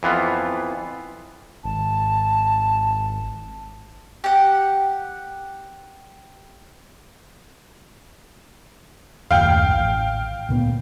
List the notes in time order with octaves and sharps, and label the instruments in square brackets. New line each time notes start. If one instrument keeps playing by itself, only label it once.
[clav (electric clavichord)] F2 E3 B3 F4
[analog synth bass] G#1 [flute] A5
[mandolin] G4 F#5
[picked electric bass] F#1 D#2 A2 [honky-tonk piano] F5 G5
[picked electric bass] A1
D2 A#2 B3